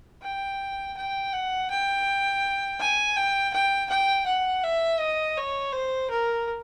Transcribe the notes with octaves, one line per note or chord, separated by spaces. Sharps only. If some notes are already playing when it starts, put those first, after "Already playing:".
G5
G5
F#5
G5
G#5
G5
G5
G5
F#5
E5
D#5
C#5
C5
A#4